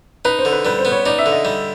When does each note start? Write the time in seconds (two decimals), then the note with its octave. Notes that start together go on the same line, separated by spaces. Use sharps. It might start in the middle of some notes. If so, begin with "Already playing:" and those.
0.25 D#4 B4
0.39 C5
0.45 D3
0.52 B4
0.65 G3 B4
0.79 C5
0.85 B3
0.92 C#5
1.06 D#4 D5
1.19 E5
1.26 D3
1.32 D#5
1.45 G3